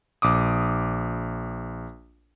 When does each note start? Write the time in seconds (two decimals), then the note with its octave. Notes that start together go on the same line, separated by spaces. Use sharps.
0.22 A#1 D6 D#6